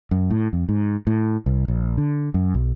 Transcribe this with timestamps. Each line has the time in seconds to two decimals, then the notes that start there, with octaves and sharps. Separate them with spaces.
0.11 F#2
0.30 A2
0.53 F2
0.69 G#2
1.07 A2
1.46 C2
1.68 A#1
1.98 D3
2.34 F#2
2.54 B1